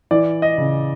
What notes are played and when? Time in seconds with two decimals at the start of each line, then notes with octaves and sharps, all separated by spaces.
0.11 E3 D5
0.42 D#5
0.58 C#3